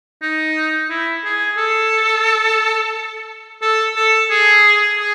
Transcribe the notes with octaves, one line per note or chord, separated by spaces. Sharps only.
D#4
E4
G#4
A4
A4
A4
G#4
G#4